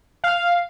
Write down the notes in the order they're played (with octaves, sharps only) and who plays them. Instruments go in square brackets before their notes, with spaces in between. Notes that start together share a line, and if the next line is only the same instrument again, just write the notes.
[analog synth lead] F5